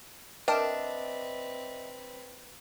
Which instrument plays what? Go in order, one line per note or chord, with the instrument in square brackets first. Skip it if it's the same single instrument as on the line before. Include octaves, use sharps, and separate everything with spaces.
[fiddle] C4 B4 [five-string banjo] D4 [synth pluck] A#4 G5 A5 [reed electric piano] D#5 E5